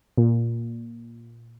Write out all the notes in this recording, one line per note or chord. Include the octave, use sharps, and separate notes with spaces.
A#2